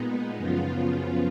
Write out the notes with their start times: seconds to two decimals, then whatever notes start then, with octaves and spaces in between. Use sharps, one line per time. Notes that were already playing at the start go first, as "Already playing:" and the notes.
Already playing: A#2 G#3 B3 D#4
0.36 F#2 C#3 F3 B3 F4